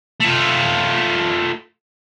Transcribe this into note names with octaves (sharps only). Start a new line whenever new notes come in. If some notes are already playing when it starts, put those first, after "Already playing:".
A3 F4